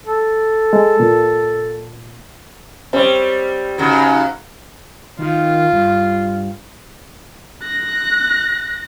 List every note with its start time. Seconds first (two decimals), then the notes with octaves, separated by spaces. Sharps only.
0.07 A4
0.73 G#3
1.00 A#2
2.93 G3 C4 C#5
3.78 G#2 C#3 F#3
5.19 D#3 F4
5.72 G2
7.63 F#6 A#6